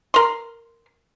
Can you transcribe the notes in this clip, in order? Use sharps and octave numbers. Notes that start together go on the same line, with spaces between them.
A#4 C6